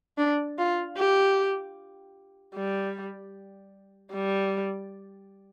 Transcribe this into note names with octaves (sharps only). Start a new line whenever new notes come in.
D4
F4
G4
G3
G3